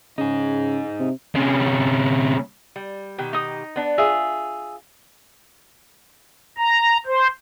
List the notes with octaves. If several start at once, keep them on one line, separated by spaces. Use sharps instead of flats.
C#3 D#4 G#4
C3
C3 C#4
G3
B2 D#3 G4
D#4 D#6
B3 D4
F4 G#4 E5
A#5
C5